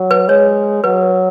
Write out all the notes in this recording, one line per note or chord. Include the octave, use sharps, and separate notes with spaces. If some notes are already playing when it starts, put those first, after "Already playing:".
Already playing: F#3
B4
G#3 C#5
F#3 B4
B4